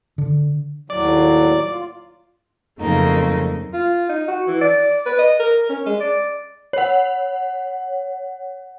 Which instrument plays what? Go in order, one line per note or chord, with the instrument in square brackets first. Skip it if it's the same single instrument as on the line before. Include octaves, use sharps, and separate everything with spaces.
[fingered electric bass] D3
[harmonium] D#2 A2 F#3 [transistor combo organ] D5
[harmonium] F4
[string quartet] F2 C#3 F#3 A3 A#3 D#4
[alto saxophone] F4
D#4
F#4
E3
D5
B4
D#5
A#4
C#4
G#3
D5
[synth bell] C#5 F#5